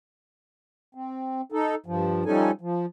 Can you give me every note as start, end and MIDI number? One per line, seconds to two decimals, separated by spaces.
0.95 1.41 60
1.52 1.75 63
1.52 1.75 69
1.86 2.24 43
1.86 2.24 53
2.26 2.51 53
2.26 2.51 55
2.26 2.51 61
2.26 2.51 63
2.26 2.51 69
2.26 2.51 80
2.61 2.86 53